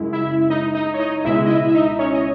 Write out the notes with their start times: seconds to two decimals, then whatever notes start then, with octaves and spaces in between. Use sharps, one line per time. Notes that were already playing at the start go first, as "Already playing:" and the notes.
Already playing: F#2 C#3 G#3 E4
0.13 E4 E5
0.50 D#4 D#5
0.75 D#4 D#5
0.94 C#5
1.00 D#4 D#5
1.24 C#2 B2 G#3 E4 E5
1.46 D#5
1.50 E4 E5
1.68 E5
1.74 D#4 D#5
1.99 C#4 C#5
2.14 D#5